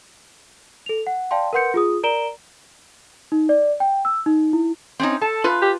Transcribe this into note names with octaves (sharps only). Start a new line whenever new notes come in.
A4 F7
F#5
D5 F5 G5 A5 C6
A#4 B4 F#5 C6 G6 C#7
F4 G#4 D#6
A#4 D5 A#5 D7 E7 G7
D#4
D5
G5
E6
D#4
E4
C4 C#4 D#4
A4 A5
F4 B4
G4